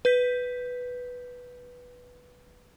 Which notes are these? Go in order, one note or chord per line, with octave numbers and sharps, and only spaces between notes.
B4 G6 B6